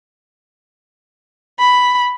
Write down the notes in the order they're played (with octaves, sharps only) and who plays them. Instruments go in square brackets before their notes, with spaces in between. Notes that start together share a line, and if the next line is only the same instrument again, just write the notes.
[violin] B5